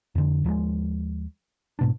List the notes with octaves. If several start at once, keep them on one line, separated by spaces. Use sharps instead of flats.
F2 D3
D#2 F3 F#3 G#3
G#2 B2 D4